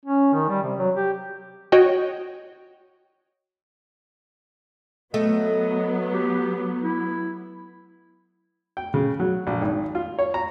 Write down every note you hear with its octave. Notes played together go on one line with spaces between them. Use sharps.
C#4
D#3
G3
C3
F#3
G4
F#4 C#5 D#5 G5
F#3 A3 B3 D#5
G4
E4
G5
C#3
F#3
A#1
G#1
F4
C#5
A#5